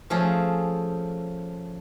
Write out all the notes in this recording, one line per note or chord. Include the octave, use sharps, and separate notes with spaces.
F3 A3 C#4 G#4